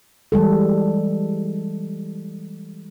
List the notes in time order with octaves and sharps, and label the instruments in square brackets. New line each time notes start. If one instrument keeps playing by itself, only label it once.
[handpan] E3 G3 G#3 A4